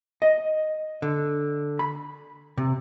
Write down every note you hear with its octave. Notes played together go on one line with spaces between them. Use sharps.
D#5
D3
B5
C3